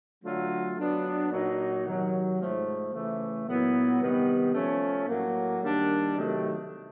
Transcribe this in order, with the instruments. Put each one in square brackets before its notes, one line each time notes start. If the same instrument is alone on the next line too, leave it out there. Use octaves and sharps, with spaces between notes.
[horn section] D3 F#3 A3 D4 F4
F#3 B3 D4
A#2 F#3 A#3 D#4 F#4
C3 D#3 F#3
G#2 F3 A3
C#3 E3 A3
A#2 F#3 B3 E4
C3 D#3 G3 B3
F3 A3 C#4
A2 F#3 A#3
D#3 G3 A#3 D4
C3 D#3 F#3 A3